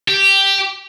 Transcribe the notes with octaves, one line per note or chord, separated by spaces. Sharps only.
G4